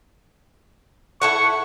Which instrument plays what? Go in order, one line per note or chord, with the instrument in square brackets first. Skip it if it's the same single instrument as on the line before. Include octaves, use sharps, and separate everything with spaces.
[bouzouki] E4 A4 F#5 [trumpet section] C#6